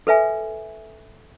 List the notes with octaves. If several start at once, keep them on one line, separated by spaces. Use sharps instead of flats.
A4 B4 E5 G#5